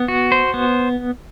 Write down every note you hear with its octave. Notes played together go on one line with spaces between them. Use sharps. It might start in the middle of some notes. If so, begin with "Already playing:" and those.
Already playing: B3
F#4
C5
B3